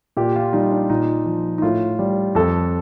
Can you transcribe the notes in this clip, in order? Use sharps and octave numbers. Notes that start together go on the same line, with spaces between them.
A#2 G4
F4
G3 D#4
D4
A#2 D#4
F3
D#4
A2 F4
G3
F2 A4